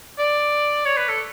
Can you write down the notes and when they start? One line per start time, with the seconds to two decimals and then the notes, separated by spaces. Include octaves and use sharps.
0.19 D5
0.85 C#5
0.97 B4
1.08 A4